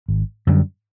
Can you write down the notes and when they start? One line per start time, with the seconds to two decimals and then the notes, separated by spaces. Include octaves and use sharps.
0.08 G#1
0.47 F#2 D3 G3